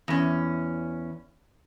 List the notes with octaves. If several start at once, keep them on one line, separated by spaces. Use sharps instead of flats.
E2 C#4